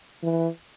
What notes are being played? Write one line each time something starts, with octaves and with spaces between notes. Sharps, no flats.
E3